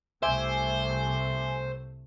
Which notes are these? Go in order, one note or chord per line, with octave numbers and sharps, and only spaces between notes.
C2 C3 A3 C5 E5 G#5 D6